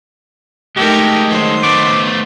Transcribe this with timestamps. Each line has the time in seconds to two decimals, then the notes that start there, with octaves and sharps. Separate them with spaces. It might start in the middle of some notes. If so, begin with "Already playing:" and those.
0.77 G#3 A3 D#4 G4 A4 A#4
1.29 D#3 F#3 C5
1.63 A3 B3 D6